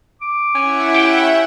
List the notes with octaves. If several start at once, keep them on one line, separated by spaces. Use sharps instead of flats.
D6
C#4 E4 E5 F#5
G4 G5